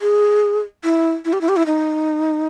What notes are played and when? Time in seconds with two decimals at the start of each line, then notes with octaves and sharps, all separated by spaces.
0.01 G#4
0.84 E4
1.25 E4
1.33 G4
1.41 E4
1.49 G4
1.57 E4
1.66 D#4